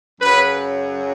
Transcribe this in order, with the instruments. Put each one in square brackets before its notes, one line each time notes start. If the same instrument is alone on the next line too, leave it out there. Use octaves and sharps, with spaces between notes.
[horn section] F#2 C#3 F#3 B4